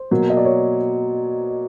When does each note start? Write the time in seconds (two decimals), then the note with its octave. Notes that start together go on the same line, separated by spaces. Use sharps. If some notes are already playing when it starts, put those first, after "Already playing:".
Already playing: C5
0.11 B2 F#3 A#3
0.30 D#5
0.37 D5
0.45 C#5